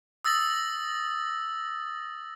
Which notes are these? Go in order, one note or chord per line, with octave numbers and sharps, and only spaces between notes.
D#6 E6 A6 A#6 F#7